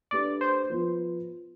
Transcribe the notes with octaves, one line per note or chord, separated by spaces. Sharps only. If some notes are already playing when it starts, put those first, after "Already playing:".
A3 D4 G4 B4 D5
C5
F3 B3 F4 B4